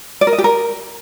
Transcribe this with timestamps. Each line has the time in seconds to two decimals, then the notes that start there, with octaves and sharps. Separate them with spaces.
0.21 D5
0.27 A#4
0.33 D#5
0.38 G4
0.44 A#4